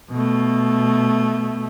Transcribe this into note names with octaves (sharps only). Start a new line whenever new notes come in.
B2 A3